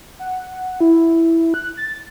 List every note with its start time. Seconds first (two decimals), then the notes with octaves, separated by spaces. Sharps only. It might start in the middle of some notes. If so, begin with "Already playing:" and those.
0.19 F#5
0.80 E4
1.54 F#6
1.77 A6